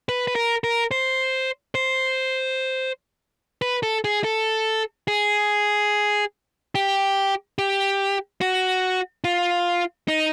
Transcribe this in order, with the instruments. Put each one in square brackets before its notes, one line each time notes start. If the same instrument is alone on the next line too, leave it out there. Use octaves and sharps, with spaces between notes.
[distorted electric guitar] B4
B4
A#4
A#4
C5
C5
B4
A4
G#4
A4
G#4
G4
G4
F#4
F4
D#4